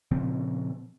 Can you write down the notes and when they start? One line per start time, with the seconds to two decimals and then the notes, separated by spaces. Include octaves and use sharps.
0.11 A#2 C#3 F3 C4